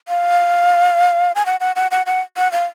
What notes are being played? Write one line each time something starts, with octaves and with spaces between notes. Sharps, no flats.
F5
G#5
F#5
F#5
F#5
F#5
F#5
F#5
F5